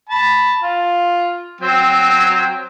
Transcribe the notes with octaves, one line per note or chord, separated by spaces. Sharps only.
A5 B5
F4
F#3 C4 G5